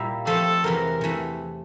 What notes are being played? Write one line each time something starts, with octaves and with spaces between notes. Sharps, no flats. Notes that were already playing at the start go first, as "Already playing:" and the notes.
Already playing: A#2 G3 A#3 E4
F3 A3 C4 A4
E2 C3 E3 A#4
C3 E3 A3